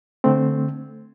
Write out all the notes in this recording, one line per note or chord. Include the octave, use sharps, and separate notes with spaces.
D3 A3 C4